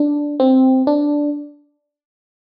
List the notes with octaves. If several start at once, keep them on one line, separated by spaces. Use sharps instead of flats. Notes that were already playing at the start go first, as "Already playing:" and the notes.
Already playing: D4
C4
D4